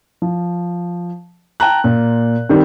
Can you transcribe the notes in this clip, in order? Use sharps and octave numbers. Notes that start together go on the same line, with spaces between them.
F3
G5 A5 A#5 F#6
A#2
D#3 G3 C4